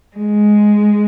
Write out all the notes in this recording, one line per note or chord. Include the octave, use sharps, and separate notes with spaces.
G#3